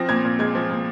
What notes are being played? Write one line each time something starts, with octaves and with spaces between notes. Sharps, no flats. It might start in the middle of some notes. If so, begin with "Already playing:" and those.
Already playing: F3 C4 A#6
A#2 G#6
A#2
G#3 G#6
F3
A#2